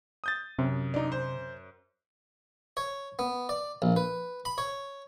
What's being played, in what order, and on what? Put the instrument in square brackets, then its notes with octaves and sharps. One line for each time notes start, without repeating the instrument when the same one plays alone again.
[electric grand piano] D#6 G6 A6
[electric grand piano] F#2 [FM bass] C3
[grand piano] D4 D#4
C5
[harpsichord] C#5
B3
D5
A#1
B4
B5
C#5